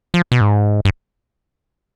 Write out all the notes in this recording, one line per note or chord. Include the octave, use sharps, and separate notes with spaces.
F3
B2
G#2
G2